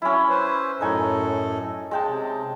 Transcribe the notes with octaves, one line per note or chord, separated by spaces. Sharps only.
F#3 C#4 E4
B4 C5
F#2 A2 D#4 A4 G#5
G#3 G5 A5
C3